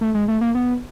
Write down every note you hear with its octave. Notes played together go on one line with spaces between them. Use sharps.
A3
G#3
A3
A#3
B3